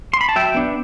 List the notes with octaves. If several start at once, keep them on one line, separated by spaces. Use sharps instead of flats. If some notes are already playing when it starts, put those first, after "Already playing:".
C6
B5
A5
F#3 E5 G5
B3 D4